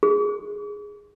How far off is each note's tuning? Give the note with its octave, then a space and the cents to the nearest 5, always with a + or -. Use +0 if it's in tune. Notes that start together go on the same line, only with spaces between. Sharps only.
G#4 -5